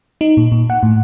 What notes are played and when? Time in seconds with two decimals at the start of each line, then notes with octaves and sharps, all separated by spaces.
0.21 D#4
0.37 A#2
0.52 A#2
0.70 F#5
0.83 A2